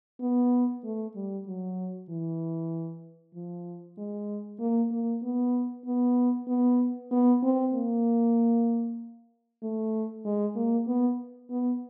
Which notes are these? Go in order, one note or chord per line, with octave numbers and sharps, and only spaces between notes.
B3
A3
G3
F#3
E3
F3
G#3
A#3
A#3
B3
B3
B3
B3
C4
A#3
A3
G#3
A#3
B3
B3